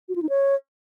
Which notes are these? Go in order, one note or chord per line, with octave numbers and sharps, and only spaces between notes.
F#4
F4
D#4
C#5